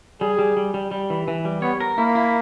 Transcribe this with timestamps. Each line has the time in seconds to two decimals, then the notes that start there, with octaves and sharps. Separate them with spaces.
0.21 G3 G#4
0.39 G3
0.57 G3
0.74 G3
0.91 G3
1.10 E3
1.28 E3
1.45 G3
1.62 B3 C#5
1.81 A#4
1.98 A#3 E4
2.15 E4